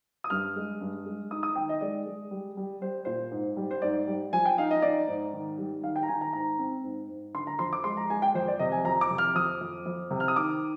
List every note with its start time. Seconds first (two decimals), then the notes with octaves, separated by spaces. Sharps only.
0.24 D#6
0.30 G2 F6
0.56 G#3
0.81 G2
1.06 G#3
1.31 D#4 D#6
1.43 D#6
1.56 D#3 G5
1.69 D#5
1.81 G#3 D5
2.06 G#3
2.31 G3
2.57 G3
2.81 G3 C5
3.05 A#2 C5
3.32 G#2
3.57 G3
3.71 C5
3.82 G#2 D5
4.07 G3
4.33 F3 G#5
4.45 G5
4.58 D#4 F5
4.71 D#5
4.82 D#4 D5
5.08 G#2
5.33 D#3
5.58 G3
5.83 D#3 F5
5.96 G5
6.03 A#5
6.08 D#3 G#5
6.21 A#5
6.33 G#2 A#5
6.58 C4
6.84 G#2
7.09 G#2
7.34 D3 C6
7.47 A#5
7.59 F2 C6
7.73 D6
7.84 G#3 C6
7.97 A#5
8.10 G#3 G#5
8.22 G5
8.34 F2 C5
8.48 D5
8.59 C3 D#5
8.72 G#5
8.85 F2 A#5
9.01 D6
9.10 C3
9.18 F6
9.35 F2 D#6
9.61 F2
9.86 F2
10.11 C3
10.20 F6
10.28 D#6
10.36 D#3 D6